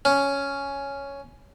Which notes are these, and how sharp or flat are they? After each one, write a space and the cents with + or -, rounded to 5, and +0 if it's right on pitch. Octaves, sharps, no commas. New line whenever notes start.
C#4 +5